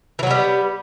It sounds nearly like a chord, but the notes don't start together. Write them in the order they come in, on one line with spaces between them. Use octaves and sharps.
E3 F#3 B3 G3